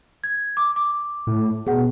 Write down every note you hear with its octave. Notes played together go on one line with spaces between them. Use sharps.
G#6
D6
D6
A2
B2 G#4 F#5